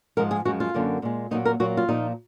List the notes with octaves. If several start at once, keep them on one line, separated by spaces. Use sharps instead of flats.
G#2 F3 G#3 A#4
G#4
F#2 F3 G#3 F#4
F4
F#2 D3 F#3 A#3
A#2 G#3
A#2 F#3 A#3 D#4
A#4
A#2 F#3 A#3 F#4
F4
A#2 F3 A#3 D#4